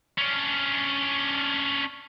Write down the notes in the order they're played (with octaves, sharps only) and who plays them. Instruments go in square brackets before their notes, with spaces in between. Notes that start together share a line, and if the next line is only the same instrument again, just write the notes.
[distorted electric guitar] C#4 D4